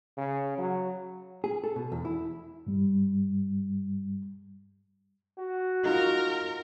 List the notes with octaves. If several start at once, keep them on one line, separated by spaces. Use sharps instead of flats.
C#3
F#3
G#4
A4
B2
E2
E4
G2 G3
F#4
D#4 F4 A#4